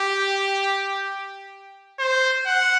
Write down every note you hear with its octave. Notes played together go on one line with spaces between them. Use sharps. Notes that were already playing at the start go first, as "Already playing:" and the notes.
Already playing: G4
C5
F#5